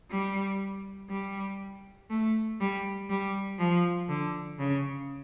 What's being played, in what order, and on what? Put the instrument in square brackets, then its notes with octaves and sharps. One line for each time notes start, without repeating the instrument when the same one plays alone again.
[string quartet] G3
G3
A3
G3
G3
F3
D3
C#3